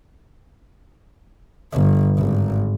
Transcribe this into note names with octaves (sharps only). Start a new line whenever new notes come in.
G1
G#1